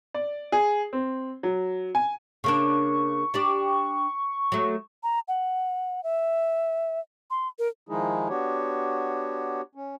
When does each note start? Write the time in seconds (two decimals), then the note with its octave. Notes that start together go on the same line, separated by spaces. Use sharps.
0.14 D5
0.52 G#4
0.93 C4
1.43 F#3
1.95 G#5
2.44 C#3 A#3 D4 C#6
3.34 D4 G4 D5
4.52 F#3 A3
5.03 A#5
5.28 F#5
6.03 E5
7.30 C6
7.59 A#4
7.89 D#3 F3 G#3 D#4 E4 G#4
8.29 B3 D4 F#4 G4 C#5
9.75 C#4